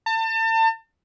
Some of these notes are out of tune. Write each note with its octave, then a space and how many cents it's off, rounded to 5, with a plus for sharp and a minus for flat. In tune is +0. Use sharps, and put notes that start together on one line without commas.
A5 +35